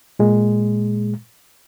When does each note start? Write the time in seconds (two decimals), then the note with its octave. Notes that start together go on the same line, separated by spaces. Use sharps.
0.19 A#2 G#3